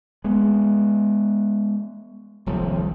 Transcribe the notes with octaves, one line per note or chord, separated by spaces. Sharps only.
G#3 B3
D#1 C2 F3